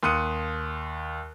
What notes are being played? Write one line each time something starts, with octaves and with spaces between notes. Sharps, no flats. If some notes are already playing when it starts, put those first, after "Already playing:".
D#2 C6 D#6 F#6 C#7 D#7